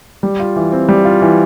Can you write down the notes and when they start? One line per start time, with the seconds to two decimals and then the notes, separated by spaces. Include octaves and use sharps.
0.23 G3
0.40 F4
0.56 E3
0.72 C4
0.89 G3
1.05 F4
1.22 E3